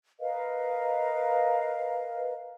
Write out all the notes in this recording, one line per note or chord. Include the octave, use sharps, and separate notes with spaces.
A#4 B4 D#5 F5